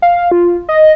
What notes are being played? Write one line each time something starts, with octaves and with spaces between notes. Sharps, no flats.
F5
F4
D#5